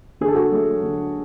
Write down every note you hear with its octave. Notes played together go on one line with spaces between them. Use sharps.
D3 G#4
A4
F#4 G#4
F#3 A3
D3